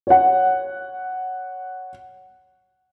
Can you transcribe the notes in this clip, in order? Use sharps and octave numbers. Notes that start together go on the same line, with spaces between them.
C#5 F#5